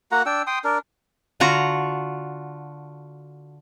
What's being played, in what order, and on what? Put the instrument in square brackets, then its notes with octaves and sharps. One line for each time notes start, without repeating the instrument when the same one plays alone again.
[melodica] A#3 F#4 F#5 A#5
D4 G5 E6
G5 C6 D#6
D4 A#4
[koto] D3 F4 F#4 A#5